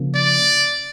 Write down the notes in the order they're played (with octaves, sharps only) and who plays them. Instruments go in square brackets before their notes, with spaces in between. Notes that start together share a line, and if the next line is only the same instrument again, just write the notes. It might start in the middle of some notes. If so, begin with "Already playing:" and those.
Already playing: [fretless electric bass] C#3 F3 A#3
[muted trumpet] D5